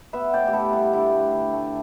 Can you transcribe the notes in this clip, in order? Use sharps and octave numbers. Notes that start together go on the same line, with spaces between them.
B3 B4 E5
A2 D5 G5
G4
B3 E4 A4
G3 E4
D3 E4
A3
D3
A3